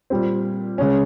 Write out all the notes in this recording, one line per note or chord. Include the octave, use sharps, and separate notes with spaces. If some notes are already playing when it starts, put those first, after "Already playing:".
A#2 G3 C4
C#3 G#3 C#4